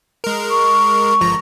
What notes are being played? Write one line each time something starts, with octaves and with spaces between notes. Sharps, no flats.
G#3 A#4
C#6
G1 F3 A#5